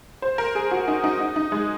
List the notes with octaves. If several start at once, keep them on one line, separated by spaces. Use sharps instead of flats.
C5
A#4
G#4
F#4
D#4
D#4
D#4
D#4
G#3